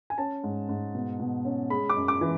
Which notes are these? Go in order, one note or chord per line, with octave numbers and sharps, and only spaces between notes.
G#5
C#4 A5
G#2
G#2
B2
B2
C#4
G#3 B5
D6
F#2
D6
E3